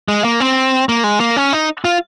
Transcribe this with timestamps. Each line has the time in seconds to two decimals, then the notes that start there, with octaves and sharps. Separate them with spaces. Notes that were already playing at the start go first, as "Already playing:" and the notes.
0.09 G#3
0.24 A#3
0.40 C4
0.89 A#3
1.04 G#3
1.20 A#3
1.36 C#4
1.53 D#4
1.85 F4